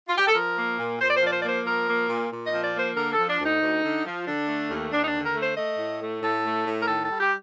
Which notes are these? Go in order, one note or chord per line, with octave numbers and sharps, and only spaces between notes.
F4
G4
A4
F3 A#4
A#3
A#2
A#2 C5
D5
C5
F3 D5
C5
A#3 D5
C5
F3 A#4
A#3
A#2
A#2
D#5
F3
D5
A#3
C5
D3 A#4
A4
F3
D4
D2
D#4
D2
D3
F3
D3 D4
A3
D#2
D#2 D4
D#4
D4
D3
A#4
A3
C5
A3 D#5
A2
A3
A2 A4
A3
A2
A#4
D#3 A4
A4
G3
G4